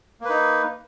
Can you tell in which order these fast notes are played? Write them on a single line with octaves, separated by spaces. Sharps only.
A#3 B4 D#4